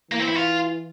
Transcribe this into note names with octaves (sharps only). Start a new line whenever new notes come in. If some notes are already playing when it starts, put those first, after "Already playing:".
E3 A#3
C4
E4
F4